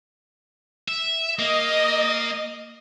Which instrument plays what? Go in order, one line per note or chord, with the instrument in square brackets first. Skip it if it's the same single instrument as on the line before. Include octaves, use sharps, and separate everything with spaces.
[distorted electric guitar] E5
[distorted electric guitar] A#3 [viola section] D#5